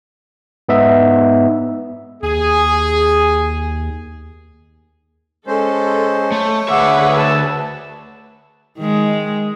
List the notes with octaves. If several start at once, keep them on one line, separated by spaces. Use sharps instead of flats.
G#2 B3 D#4 E5
D#2 G#4
G#3 C#4 A4 C5
A3 C#5
D2 G#4 B4 E5 F#5 D6 E6
A5 E6
D#3 G#3